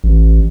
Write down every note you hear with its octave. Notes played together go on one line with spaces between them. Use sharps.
A1